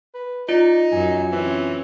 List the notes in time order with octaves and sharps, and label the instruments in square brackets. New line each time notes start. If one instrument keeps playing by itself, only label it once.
[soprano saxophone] B4
[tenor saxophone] D#4 [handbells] F4 [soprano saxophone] D5
[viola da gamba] F#2 [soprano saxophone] G#5
[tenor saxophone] E3 [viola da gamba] C4 C#4